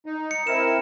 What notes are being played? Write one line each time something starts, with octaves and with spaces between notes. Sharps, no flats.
D#4
C#7
C4 E4 A#4 E7